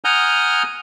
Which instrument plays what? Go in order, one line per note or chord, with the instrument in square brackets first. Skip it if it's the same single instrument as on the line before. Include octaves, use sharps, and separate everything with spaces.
[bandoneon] F#5 G#5 A#5 D#6 F6 G6